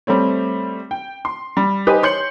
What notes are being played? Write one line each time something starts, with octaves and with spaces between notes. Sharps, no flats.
G3 A3 C4 C#5
G5
C6
G3
D#4 G4 B4 C5 G#5 D#6
C#5 C6 G6 C#7 F#7